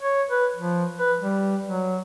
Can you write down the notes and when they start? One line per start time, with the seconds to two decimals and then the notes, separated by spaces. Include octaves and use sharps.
0.01 C#5
0.29 B4
0.56 F3
0.98 B4
1.21 G3
1.67 F#3